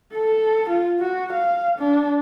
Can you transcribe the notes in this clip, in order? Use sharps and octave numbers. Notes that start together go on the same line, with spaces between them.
A4
F4
F#4
F5
D4